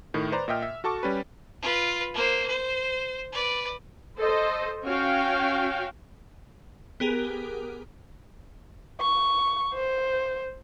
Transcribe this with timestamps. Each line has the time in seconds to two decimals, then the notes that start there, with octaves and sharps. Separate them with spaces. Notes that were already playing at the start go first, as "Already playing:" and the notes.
0.14 A2 D#3
0.32 B4 C5 D5 A#5
0.48 A#2 D#5 E5 G5 F6
0.62 E5
0.84 F#4 A4 A5 C#6 D6
1.03 G3 C#4 G4 B4
1.61 F4 B4
2.14 A#3 C5
2.47 C5
3.32 B4 D5
4.19 A4 C5 D#5
4.84 C#4 F#4 C#5 F5 G5
7.00 B3 G4 G#4 A#4
9.00 C#6
9.74 C5